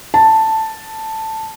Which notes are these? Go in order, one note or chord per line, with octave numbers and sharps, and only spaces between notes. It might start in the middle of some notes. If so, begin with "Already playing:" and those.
A5